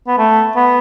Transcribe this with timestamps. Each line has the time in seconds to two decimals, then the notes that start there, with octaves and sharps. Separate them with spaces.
0.07 B3
0.18 A3
0.56 B3